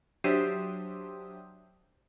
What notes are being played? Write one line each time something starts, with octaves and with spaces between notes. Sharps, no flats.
F#3 D4 G4 C5 E5 D#6